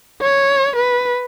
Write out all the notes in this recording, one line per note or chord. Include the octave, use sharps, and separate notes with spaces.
C#5
B4